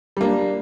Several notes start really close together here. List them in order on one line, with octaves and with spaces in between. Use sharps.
G3 A#3 D4